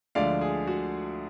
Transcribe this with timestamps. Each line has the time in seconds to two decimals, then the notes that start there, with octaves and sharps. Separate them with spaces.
0.15 D2 D3 F3 G#3 D5 F5
0.41 G#4
0.67 F#4